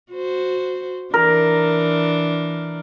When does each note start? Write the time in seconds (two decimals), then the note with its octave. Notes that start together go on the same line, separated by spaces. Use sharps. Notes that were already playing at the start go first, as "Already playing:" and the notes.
0.11 F#4 C5
1.14 E3 D4 A#4